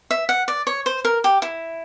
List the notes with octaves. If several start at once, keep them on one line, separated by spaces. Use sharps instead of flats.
E5
F#5
D5
C#5
C5
A#4
G4
E4